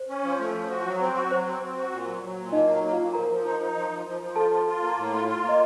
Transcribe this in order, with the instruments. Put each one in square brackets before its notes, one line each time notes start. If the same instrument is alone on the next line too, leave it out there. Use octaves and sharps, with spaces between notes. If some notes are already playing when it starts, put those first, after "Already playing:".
Already playing: [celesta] C5
[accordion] C#4
F3
A3
F3
F#4
F#3
C4
F#4
[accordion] F#3 [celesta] C5
[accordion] C4
C4
F#4
A#2
F#3
F#3
A#2
[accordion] A#3 [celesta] D#4 D#5
[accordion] F#3
A#3
[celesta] F4 F5
[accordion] A#2
[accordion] F3 [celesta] A#4 A#5
[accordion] F3
D#4
D#4
F3
F3
F3
F3
[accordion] F4 [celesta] A4 A5
[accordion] F4
F4
A#3
A2
F4
F4
A#3
[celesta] D#5